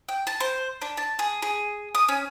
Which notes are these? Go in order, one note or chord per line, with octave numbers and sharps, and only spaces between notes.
G5
A5
C5
D4
A5
G#4
G#4
D#6
C#4